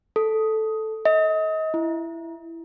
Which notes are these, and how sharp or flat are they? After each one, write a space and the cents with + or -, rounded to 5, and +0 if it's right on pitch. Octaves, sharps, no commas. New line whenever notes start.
A4 -5
D#5 +30
E4 +10